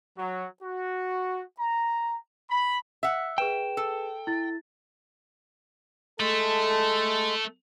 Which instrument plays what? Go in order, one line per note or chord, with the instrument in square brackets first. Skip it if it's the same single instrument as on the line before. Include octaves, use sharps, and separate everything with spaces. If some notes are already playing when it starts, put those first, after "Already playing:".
[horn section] F#3
F#4
A#5
B5
[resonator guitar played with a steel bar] E5 F#5 [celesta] E6
[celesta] G#4 B4 E7 [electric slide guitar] G5
[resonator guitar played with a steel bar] A4
[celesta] E4 A6
[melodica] G#3 [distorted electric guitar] A3 [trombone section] A4